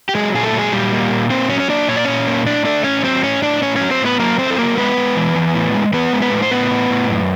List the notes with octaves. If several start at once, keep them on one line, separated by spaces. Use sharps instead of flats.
G4
F#3 G#3 G#4
A#2 G#4
A3 A4
F#3
G#3 G#4
A#2 G3 G4
A#3
A#2
A#3 C4 C5
F#3 C#4 C#5
C#5
A#3 D4 D5
A#2 C#5
D5
A#2 C#4 C#5
A#3
A2 D4 D5
A3 D4 D5
A2 C#4 C#5
F#3 C4 C5
A2 C#4 C#5
A2 D4 D5
A2 C#4 C#5
F#3 C#4 C#5
C4 C5
A2 B3 B4
F#3 A#3 A#4
A3 C4 C5
A4
F#3 A#3 A#4
G#3 B3 B4
G#3
E3
E3
A2
G#3
E3 B3 B4
G#3
B3 B4
A2
C5
A2 B3 B4
A2
A2
F#2